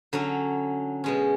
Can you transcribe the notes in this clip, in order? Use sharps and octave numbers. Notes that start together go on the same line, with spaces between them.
D3 F#3 C#4
B2 G#3 C#4